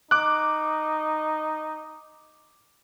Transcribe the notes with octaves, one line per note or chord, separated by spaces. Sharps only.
D#4 D6 F#6